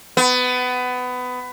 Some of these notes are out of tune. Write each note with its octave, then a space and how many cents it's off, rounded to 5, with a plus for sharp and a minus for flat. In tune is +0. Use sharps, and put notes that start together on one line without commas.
B3 +20